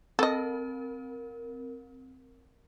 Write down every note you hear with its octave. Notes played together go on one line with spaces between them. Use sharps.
C4 A4 A#4 D#5